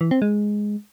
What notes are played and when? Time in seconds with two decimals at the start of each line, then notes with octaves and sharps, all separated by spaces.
0.01 E3
0.11 C4
0.22 G#3